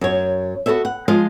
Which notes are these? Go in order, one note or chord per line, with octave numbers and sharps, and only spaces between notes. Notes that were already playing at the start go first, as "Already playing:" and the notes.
F#2 C#5
B3 F#4 A4 C#5 E5
F#5
F3 G#3 F4 D#5 F5